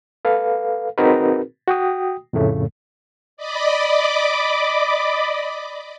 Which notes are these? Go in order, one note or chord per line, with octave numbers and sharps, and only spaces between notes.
A4 B4 F5
C4 D#4 F#4 G#4 A#4 B4
F#4 G5 D#6
F2 A2 C#3 A3
D5 D#5 B5 D6